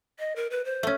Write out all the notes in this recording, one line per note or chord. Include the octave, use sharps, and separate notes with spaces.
D#5
A#4
B4
C5
A3 C#4